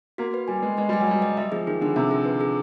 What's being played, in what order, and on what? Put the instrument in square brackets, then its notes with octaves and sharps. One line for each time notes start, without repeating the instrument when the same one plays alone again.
[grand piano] A#3 [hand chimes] F#4
[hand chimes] B4
[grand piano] G3 [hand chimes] G#5
[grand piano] G#3 [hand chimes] B4
[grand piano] G#3 [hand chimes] B4
[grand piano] G3 [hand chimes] G#5
[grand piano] F#3
[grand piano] G3 [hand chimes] D#5
[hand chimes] D#5
[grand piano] G3 [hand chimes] E5
[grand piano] F3 [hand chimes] G#4
[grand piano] D#3 [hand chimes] G#4
[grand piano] D3 [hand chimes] G#4
[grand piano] C3 [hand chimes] E5
[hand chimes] G#4
B4
G#4